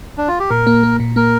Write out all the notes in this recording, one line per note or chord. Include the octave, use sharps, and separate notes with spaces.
D4
F4
G4
A#2 A#4
A#3
A#3
A#2
A#3 A#4